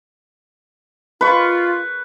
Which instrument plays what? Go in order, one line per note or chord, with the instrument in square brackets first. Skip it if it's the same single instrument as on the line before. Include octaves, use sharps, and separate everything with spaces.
[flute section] F4 [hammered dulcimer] B4 C#6